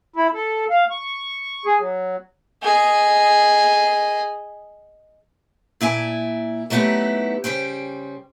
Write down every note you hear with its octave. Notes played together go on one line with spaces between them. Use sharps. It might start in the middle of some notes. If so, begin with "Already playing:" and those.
E4
A4
F5
C#6
G#4
F#3
G#4 D#5
A#2 E4 D5 G#5
F#3 A3 B3 D#4 E4 G4
C#3 G3 C5 G5